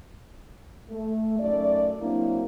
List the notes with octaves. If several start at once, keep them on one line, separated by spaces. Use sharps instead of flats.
A3
F#2 A3 D#4 D5
F#3 A#3 C4 D4 E4